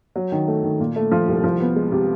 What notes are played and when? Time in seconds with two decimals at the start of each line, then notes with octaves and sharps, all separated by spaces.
0.16 F#3
0.32 D#3
0.47 A3
0.63 D#3
0.80 A#2
0.96 A3
1.12 F3
1.28 C2
1.44 F3
1.60 B3
1.76 G#3
1.92 C3